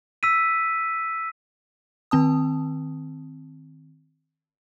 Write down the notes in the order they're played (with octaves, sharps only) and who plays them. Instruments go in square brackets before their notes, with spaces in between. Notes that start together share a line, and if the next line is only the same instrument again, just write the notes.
[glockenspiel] E6 B6 D#7
[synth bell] D#3 C4 A5 D#6